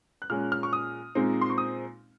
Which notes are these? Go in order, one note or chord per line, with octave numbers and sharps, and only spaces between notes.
F#6
A#2 G#3 C#4 F6
F6
C#6
D#6
A#2 G#3 C4 D#4
C6
C#6
D#6